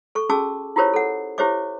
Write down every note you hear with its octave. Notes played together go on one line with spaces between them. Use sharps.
A4 C#6
C#4 F#4 G#4 A5 D6 E6
E4 F4 G4 A#4 C5 C#5
A4 F#5
E4 G4 C5 C#5 E5 D6